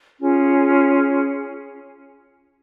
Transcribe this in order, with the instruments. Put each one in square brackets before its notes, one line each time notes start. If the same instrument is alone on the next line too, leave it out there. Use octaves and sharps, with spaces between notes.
[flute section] C#4 F4 G#4